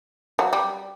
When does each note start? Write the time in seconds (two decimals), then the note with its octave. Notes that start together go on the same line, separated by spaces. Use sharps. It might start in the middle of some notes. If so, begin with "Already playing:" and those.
0.39 F#3
0.53 G3